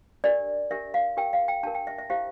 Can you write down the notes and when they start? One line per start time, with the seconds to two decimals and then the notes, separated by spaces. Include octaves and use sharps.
0.24 D4 G4 A#4 D5
0.71 D4 G4 A#4 E5
0.94 F5
1.17 D4 G4 A#4 G5
1.33 F5
1.48 G5
1.63 D4 G4 A#4 A5
1.75 G5
1.87 E5
1.98 E5
2.10 E4 G4 C5 F5